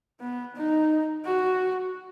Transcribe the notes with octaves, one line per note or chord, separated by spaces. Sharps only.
B3
D#4
F#4